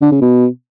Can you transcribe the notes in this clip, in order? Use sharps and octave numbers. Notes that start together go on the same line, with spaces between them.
D3
C#3
B2